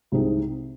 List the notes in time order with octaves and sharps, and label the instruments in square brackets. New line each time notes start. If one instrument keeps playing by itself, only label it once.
[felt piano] C2 C3 G#3 C4 D#4